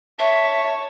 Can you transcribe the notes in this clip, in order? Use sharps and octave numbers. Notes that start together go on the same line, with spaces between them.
C#5 E5 A5